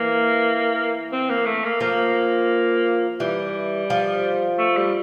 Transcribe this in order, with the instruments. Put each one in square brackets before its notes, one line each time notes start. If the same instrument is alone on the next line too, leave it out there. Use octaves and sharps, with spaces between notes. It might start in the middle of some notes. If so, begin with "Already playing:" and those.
Already playing: [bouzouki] E3 [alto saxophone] A#3
[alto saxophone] C4
A#3
A3
A#3
[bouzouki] F3 [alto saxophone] A#3
[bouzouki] E3 [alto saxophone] G3
[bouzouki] F3
[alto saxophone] A3
G3